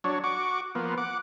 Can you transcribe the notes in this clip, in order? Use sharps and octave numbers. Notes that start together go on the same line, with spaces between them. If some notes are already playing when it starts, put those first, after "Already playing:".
F#3 D4 C#5
F#4 C#6 D6
F3 A#3 B3
F#5 D6